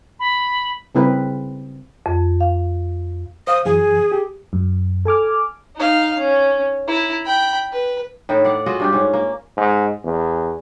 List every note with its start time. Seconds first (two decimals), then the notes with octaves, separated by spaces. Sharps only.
0.20 B5
0.95 C#3 G3 C4 E4 A#4 B4
2.06 F2
2.40 F5
3.47 C5 F5 D#6
3.65 F#2 E3 G#4 G#5
4.12 G4
4.53 F#2
5.05 A4 G#5 D6 F6
5.76 D#4 F5
6.18 C#4
6.87 E4 A#5
7.25 G5 B5
7.72 B4
8.29 A2 D#3 E4
8.45 D5 F5 F#5
8.66 F4 F#4 G#4 D#5
8.80 G2 D4 G4
8.93 G#2 C#4
9.13 A#3
9.57 G#2
10.04 E2